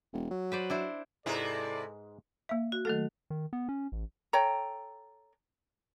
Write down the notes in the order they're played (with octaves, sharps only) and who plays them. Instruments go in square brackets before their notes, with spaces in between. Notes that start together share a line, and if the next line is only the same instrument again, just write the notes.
[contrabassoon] E1
F#3
[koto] B4 C5 D5
D4 E4 C5
[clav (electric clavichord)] G#2 G#3 B4 [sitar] C3 E4 [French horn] A4 [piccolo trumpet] D5
[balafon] A#3 E5
[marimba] F#4
[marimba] D#3 F#3 A3 [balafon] A4
[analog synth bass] D#3
B3
C#4
A1
[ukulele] A4 C#5 G5 A#5